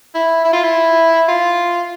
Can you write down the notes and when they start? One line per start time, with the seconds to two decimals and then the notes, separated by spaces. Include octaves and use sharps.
0.14 E4
0.44 E4
0.53 F4
0.63 E4
1.28 F4